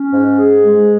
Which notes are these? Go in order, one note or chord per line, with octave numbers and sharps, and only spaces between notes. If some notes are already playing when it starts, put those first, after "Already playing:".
Already playing: C#4
G#2
G#4
G#3